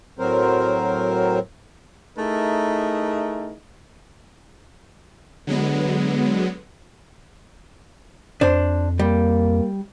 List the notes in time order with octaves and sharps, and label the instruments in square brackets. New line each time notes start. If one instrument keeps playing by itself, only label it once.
[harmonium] A2 F#3 C4 A#4 C5
[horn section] A3 D#4 E4 G#4 A#4
[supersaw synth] D3 F#3 G#3 B3
[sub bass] F2 [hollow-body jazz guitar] D4 C5
[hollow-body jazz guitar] G3 [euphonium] A#3